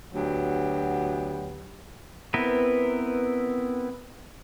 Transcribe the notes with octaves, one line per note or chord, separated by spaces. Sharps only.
D2 F#3 B3 G4
B3 C4 E4 A#4 B4